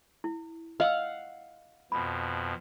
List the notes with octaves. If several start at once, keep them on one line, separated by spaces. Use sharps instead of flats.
E4
D#5 F5 F#5 E6
F2 B2 B5